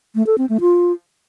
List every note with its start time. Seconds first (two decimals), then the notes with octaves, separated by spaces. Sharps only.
0.15 A3
0.27 A4
0.38 C4
0.49 A3
0.61 F4